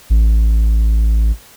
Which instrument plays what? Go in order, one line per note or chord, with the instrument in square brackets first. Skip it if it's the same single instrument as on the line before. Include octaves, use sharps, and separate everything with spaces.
[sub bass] A1